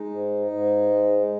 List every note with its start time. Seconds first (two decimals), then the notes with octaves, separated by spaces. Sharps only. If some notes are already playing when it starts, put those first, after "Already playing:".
Already playing: G#3 D#4
0.11 G#2
0.51 G#2
0.90 G#3